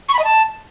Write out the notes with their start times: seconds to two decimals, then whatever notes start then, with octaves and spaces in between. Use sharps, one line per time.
0.09 C#6
0.14 B5
0.19 D#5
0.24 A5